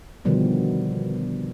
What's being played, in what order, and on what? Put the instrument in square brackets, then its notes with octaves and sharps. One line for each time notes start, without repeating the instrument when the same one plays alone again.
[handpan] B2 D3 D#3 F3 G3 B3